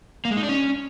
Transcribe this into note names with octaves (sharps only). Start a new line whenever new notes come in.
A#3
G#3
D#4
D4
C#4